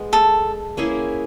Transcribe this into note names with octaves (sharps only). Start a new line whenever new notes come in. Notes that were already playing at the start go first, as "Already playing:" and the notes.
Already playing: G#3 B3
A4
A#3 C#4 E4 G#4